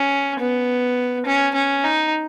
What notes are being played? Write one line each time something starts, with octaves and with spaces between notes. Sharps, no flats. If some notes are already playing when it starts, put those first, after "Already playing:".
Already playing: C#4
B3
C#4
C#4
D#4